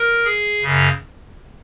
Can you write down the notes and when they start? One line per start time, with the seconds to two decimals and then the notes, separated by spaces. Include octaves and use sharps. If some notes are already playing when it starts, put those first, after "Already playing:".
Already playing: A#4
0.25 G#4
0.62 F#2 C#3